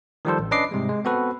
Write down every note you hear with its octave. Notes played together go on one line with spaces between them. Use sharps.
D#3 F3 G3 F4 A4 C5
A1
C#4 D4 B4 D#5 D6 C7
G#2 C3 G3 G#3
G#3
B3 C4 F#4 A4 B4